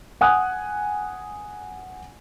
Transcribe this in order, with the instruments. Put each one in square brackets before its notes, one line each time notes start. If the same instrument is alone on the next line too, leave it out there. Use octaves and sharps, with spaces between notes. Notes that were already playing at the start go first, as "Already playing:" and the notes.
[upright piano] F#5 G#5 D#6 F#6